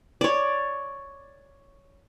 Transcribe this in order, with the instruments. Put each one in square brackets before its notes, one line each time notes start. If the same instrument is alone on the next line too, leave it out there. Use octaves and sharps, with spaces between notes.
[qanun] C#5 D5